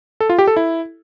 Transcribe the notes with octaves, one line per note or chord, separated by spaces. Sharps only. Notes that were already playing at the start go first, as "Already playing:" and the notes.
A4
F4
G4
A4
E4